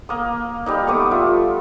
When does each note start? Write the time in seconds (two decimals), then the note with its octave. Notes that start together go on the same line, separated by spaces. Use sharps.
0.09 A#3 D#6
0.66 G3 A#3 D#4
0.87 A3 B3 D6 D#6
1.11 G3 F4 E5